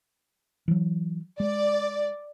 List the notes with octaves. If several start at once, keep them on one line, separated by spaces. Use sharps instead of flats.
E3 F#3
G#3 D5